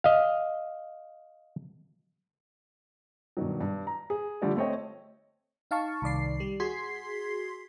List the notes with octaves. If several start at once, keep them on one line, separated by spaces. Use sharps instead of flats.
D#5 F5
G2 B2 D#3 F#3
G2
A#5
G#4
D3 F3 G3 A3 D5
A3 C4 C#5 D#5 G5
D#4 F5 A5 C#6
C2 D#3 D5 C7
G3
F#4 G#4 C6 G#6 B6 C7